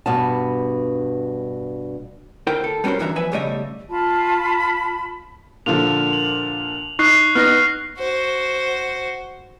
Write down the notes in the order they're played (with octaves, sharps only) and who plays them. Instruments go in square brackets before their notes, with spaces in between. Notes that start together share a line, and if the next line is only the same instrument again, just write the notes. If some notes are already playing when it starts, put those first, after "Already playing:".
[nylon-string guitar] G2 B2 G3 B3 F5 A5
[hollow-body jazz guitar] D2 E4 A#4 C5 G5
A4
G3 B3 C#4 F#4 A#4 C5
D2 G2 E3 F#4 E5 A#5
E2 F3 B4 E5 G#5
B1 C#3 G3 A3 D#5 E5
[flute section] F4 A5 B5
[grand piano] A#2 D3 F3 [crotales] F7
[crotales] F#7
[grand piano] D#4 [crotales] C#6 F#6 C7
[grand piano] B3 D#4 [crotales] F6 A#6
[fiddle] F#4 C5